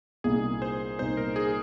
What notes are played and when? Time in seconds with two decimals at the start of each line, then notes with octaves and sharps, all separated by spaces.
0.24 C2 A#2 A#3 D#4 G#4
0.62 C5
0.99 C2 A#2 A#3 D#4 C5
1.17 A#4
1.36 G#4